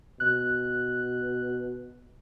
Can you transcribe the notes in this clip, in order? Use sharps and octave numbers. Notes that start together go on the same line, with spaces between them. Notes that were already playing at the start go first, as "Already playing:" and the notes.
B2 F#6